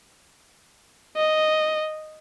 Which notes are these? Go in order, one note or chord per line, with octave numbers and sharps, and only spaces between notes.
D#5